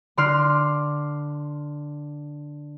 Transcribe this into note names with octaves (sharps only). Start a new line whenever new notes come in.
D3 D5 C6 F6